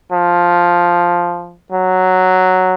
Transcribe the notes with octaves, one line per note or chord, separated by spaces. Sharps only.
F3
F#3